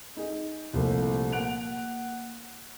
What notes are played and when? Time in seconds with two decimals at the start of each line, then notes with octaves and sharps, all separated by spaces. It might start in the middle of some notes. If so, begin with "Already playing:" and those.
0.17 D#4 G#4
0.73 C2 A#2 F3 A3
1.32 A#3 F#5 F#6 D7 F7